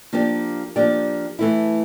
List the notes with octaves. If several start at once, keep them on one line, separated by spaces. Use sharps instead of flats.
F3 A#3 D4 G4 D5
F3 A#3 D4 G4 D5
E3 A3 E4